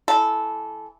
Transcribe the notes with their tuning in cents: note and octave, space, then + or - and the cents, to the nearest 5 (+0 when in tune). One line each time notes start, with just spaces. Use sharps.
E3 +0 A4 -15